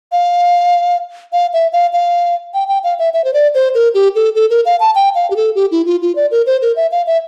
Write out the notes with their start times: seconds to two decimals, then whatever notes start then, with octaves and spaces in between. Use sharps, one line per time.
0.12 F5
1.33 F5
1.53 E5
1.73 F5
1.93 F5
2.54 G5
2.68 G5
2.84 F5
2.99 E5
3.14 E5
3.24 C5
3.34 D5
3.55 C5
3.75 A#4
3.94 G4
4.15 A4
4.35 A4
4.50 A#4
4.66 F5
4.80 A5
4.95 G5
5.15 F5
5.30 G4
5.36 A4
5.55 G4
5.71 E4
5.86 F4
6.02 F4
6.16 D5
6.31 A#4
6.46 C5
6.62 A#4
6.76 E5
6.92 F5
7.07 E5